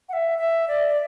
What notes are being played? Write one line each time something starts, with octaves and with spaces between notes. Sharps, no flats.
F#5
E5
E5
D5
D5